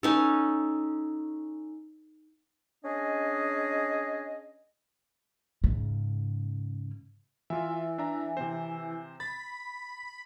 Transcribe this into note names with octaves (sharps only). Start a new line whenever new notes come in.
C#4 D#4 A4
C#4 D4 G#4 D#5
G#2 C#3
E3 F4 E5
D4 E5 A#5
C3 C4 C5
B5 A6